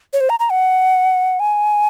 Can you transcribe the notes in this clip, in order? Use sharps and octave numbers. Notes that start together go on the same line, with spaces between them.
C#5
C5
A#5
A#5
F#5
G#5